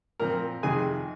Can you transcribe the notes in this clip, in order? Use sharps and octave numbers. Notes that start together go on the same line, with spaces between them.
A#2 F3 C4 A#4 A#5
F2 C3 D#3 G#4 G#5